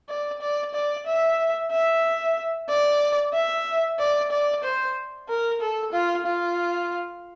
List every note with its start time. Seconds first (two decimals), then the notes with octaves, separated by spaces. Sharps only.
0.09 D5
0.41 D5
0.74 D5
1.07 E5
1.71 E5
2.69 D5
3.34 E5
3.99 D5
4.31 D5
4.64 C5
5.29 A#4
5.61 A4
5.93 F4
6.26 F4